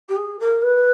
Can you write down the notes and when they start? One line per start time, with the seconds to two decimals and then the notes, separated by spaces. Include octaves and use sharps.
0.09 G4
0.16 G#4
0.39 A#4
0.62 B4